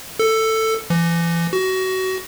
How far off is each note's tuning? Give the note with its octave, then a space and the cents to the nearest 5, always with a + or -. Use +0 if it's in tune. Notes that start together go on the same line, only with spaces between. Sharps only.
A4 +10
E3 +35
F#4 +25